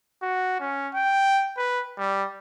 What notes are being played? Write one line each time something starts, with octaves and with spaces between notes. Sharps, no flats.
F#4
C#4
G5
B4
G3